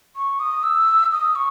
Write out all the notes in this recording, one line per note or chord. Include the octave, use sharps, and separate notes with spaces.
C#6
D#6
E6
D#6
C#6